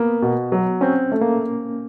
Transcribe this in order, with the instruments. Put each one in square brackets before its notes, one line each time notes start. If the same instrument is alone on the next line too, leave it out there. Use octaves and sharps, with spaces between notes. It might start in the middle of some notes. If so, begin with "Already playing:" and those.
Already playing: [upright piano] A#3 [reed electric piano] B3
[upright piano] B2
F#3
[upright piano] C4 [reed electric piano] C#4
[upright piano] A3
[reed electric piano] A#3